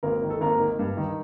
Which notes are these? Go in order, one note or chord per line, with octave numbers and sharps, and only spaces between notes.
G#1 A#3 A#4
D#3
A4
G#1 A#3 A#4
D#3
G2
D#3